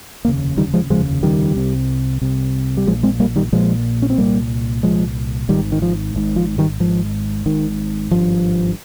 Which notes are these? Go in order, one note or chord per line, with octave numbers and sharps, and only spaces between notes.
F1 D#2 C#3 A#3
D#3 G3
F3 G#3
F1 D#2 C#3 F3 G#3
D#3 G3
C2 C3
C2 C3
G3
A#1 A#2 F3 G#3
G#3 C4
G3 A#3
D#3 G3
A#1 A#2 F3 G#3
C#4
C4
C2 A#2 G3 A#3
C2 A#2 F3 G#3
G#1 G#2 D#3 G3
D#3
F3
G#1 G#2
F3
D#3 G3
G#1 G#2 F3
G#1 G#2 D#3
G#1 G2 F3